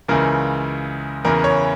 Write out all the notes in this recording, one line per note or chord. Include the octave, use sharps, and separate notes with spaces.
C#2 C#3 E3 A#4
E2 C#3 E3 A#4
C#5